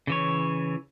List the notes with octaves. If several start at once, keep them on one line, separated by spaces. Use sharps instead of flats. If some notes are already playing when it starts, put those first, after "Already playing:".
C#3 E3 C#5